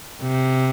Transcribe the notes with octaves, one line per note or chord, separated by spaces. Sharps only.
C3